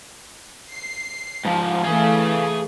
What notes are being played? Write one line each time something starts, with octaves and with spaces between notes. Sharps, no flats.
C7
G#2 F3
E3 A3 G#4 F5